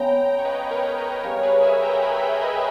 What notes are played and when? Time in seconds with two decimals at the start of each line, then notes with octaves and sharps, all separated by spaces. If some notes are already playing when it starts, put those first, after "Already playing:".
Already playing: C#3 G#3 B3 G5 A#5
0.39 C#5
0.45 B4 D#5
0.67 B4
0.71 A#4 C#5
0.97 B4 D#5
1.23 C#3 G3 C#4 A#4 C#5
1.43 G#4 B4
1.63 E5 G#5
1.82 G5 A#5
2.02 G#5 B5
2.17 B5
2.22 G5 A#5
2.41 D#5 G5